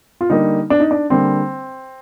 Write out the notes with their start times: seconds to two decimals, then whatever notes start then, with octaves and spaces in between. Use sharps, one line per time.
0.21 F4
0.30 D3 G3 A#3 D#4
0.70 D4
0.80 D#4
0.91 D4
1.10 D3 G3 A#3 C4